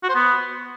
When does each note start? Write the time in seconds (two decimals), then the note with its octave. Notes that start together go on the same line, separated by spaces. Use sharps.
0.04 F#4
0.09 C5
0.15 B3